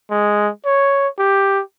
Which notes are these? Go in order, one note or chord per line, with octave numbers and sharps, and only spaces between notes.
G#3
C#5
G4